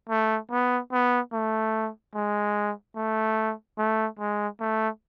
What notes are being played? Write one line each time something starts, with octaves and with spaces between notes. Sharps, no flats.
A3
B3
B3
A3
G#3
A3
A3
G#3
A3